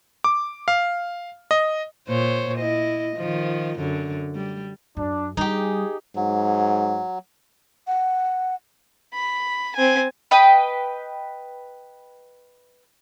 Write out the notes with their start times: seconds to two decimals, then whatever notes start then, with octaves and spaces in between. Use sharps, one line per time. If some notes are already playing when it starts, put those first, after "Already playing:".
0.24 D6
0.68 F5
1.51 D#5
2.08 A#2 C5 C#5
2.58 E4 D#5
3.17 D#3 F3
3.79 F#2 D3
4.35 G3
4.97 F#2 D4
5.37 G3 D#4 G4 G#4
6.15 G#2 F#3
7.87 F#5
9.14 B5
9.76 C4 G#5
10.31 B4 D#5 G5 B5